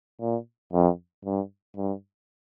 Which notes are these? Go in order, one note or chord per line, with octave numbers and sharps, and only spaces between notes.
A#2
F2
G2
G2